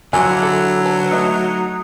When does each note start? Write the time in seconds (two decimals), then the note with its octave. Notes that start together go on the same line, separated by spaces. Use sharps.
0.13 D3 F3 F#3 E4 F4 G#5 D6
0.43 A4
0.85 B4 A5
1.11 A3 D#4 E5